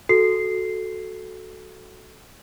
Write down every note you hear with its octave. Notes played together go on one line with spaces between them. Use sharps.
F#4 A4 C7